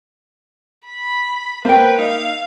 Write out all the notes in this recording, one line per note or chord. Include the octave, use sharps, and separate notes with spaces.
B5
A#3 B4 C5 G5
D#4 E5 F5